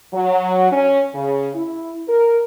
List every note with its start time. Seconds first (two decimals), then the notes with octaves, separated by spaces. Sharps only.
0.12 F#3
0.70 C#4
1.13 C#3
1.54 E4
2.07 A#4